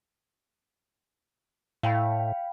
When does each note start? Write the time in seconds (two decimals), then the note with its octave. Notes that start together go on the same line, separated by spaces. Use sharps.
1.83 A2 F5 G5 B5